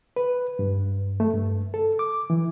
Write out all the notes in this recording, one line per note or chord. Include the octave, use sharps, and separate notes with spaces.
B4
G2
A3
G2
A4
D6
E3